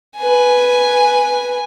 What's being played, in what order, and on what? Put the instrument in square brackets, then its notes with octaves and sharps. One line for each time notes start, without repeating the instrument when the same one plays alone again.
[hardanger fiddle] B4 G#5